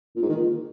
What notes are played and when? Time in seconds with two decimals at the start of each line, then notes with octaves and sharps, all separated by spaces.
0.16 A#2
0.23 G#2
0.29 D#3
0.36 A#2